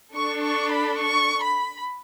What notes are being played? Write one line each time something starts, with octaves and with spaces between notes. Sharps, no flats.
D4 A4 C#6
C#6
B5
C#6
B5